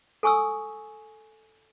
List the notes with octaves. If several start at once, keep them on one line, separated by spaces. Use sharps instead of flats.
A4 G#5 C#6 D#6 E6